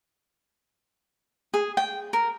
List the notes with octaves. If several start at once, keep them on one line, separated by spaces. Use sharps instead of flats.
G#4
G5
A#4